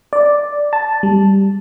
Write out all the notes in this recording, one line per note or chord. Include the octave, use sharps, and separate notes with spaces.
D5
A5
G3